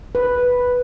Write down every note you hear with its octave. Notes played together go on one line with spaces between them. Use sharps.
B4